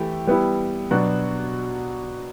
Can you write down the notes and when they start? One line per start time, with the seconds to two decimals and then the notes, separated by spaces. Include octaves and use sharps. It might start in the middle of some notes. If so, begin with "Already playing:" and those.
Already playing: E3 A3 E4 G4
0.27 G3 B3 E4 G4
0.91 B2 F#3 B3 D4 F#4